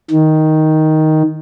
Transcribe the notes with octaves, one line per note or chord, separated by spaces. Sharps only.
D#3